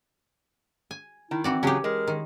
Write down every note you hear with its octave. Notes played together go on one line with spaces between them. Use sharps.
G#5
D#3 E4
E3 C4 F#4 D5
C#3 F#3 C#4 G4 G#4
G#3 A#4
D#3